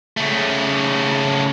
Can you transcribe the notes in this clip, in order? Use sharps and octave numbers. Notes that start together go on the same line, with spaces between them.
C#3 A3